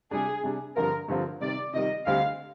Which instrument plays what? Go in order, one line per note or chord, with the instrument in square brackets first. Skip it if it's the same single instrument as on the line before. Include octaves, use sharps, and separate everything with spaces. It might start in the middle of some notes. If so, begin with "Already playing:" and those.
[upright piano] C3 G3 D4 [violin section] G#4
[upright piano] C3 G3 D4
[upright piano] G2 D3 F3 C4 F4 [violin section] A#4
[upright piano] G2 D3 F3 C4 F4
[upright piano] C3 D#3 G3 [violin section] D5
[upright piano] C3 D#3 G3 [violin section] D#5
[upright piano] D2 D3 G3 C4 G4 [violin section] F5